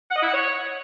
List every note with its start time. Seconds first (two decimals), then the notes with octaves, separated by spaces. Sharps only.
0.11 F#5
0.16 D#5
0.22 E4
0.28 F#5
0.33 C#5